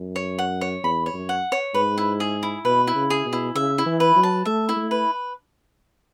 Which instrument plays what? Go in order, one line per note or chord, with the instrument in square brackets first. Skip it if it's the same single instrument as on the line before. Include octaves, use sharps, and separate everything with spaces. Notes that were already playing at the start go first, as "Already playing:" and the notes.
Already playing: [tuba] F#2
[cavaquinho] C#5
F#5
C#5
[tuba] E2 [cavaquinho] B5
[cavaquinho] C#5
[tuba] F#2
[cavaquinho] F#5
C#5
[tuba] G#2 [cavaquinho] B4
[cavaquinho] E4
G#4
E4
[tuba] B2 [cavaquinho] B4
[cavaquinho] E4
[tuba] C#3
[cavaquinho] G#4
[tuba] B2
[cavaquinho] E4
[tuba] C#3 [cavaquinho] E5
[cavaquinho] E4
[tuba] E3
[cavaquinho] B4
[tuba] F#3
[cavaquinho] A5
[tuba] A3 [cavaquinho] E5
[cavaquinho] E4
[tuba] A3
[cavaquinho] B4